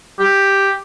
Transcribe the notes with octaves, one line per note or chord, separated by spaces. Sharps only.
G4